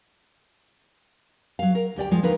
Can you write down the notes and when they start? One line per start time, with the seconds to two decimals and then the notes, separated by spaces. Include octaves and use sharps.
1.59 F#3 F5
1.75 A#4
1.96 D2 G4 D5 G5
2.11 F3 G#3 F4
2.23 D2 D#4 A#4 B4 F5